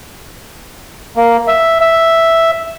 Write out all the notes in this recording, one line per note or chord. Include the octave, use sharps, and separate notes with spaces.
A#3
E5
E5